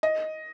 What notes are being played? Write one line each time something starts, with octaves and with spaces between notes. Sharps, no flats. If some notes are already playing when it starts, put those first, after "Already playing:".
D#5